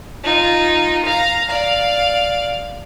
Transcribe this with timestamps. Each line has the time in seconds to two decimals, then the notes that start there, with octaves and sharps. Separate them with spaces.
0.24 D#4 F4
1.05 F5 A#5
1.50 D5 F5